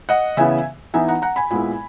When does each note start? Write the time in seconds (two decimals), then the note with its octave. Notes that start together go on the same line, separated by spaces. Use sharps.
0.09 D#5 F#5
0.37 C#3 E3 B3 E5 G#5
0.94 E3 B3 D#4 E5 G#5
1.08 F#5 A#5
1.22 F#5 A#5
1.36 G#5 B5
1.51 A#2 G#3 B3 E4 G#5 B5